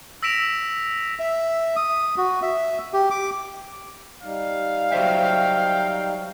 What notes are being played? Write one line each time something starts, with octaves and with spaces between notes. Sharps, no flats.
E6 A#6 B6 D7 E7 F7
E5
D#6
F#4
E5
G4
D6
G3 D#4 F5
F#3 C5 E5 G5